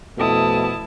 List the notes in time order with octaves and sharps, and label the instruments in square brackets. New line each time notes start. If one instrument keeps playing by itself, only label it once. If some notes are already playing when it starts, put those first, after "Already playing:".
[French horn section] F2 B2 A3 [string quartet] E4 A5 D#6